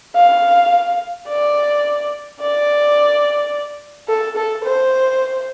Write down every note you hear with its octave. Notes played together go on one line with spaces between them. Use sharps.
F5
D5
D5
A4
A4
C5